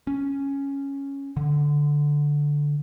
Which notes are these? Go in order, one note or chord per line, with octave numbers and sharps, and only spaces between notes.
C#4
D3